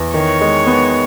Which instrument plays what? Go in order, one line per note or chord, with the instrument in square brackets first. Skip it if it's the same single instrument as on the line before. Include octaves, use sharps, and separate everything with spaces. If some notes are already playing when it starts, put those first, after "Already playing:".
Already playing: [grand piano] E2
[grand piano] D#3 [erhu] C#5
[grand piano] G#3
B3